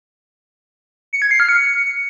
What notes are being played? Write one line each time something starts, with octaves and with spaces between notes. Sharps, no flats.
C#7
G#6
C7
F6
C#7